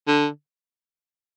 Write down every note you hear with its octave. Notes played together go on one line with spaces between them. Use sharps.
D3